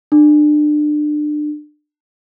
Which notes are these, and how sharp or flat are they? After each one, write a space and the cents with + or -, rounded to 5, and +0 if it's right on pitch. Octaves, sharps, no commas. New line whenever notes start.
D4 +30